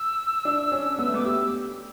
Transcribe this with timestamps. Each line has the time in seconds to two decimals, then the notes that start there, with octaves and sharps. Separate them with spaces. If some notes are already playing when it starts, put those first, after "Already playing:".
Already playing: E6
0.45 D4
0.72 C#4
0.99 B3
1.07 A3
1.14 B3 D6
1.25 G4 E6